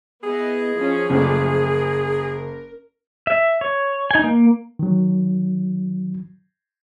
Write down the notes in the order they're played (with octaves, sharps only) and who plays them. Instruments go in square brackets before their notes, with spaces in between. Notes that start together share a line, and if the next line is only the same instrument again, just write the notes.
[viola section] B3 E4 D#5 [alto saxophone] G#4
[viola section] F3 C#4
[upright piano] F#1 [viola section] F3 A3 D5
[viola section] A#4
[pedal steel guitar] E5
C#5
D#4 G#5
A#3
[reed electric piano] D#3 F#3